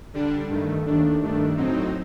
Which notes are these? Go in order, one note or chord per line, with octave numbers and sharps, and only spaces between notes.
D3 G3 D4
G2 D#3 A3
D#2 D#3 A3 D4
G2 D#3 A3 D4
A2 F#3 C4 D#4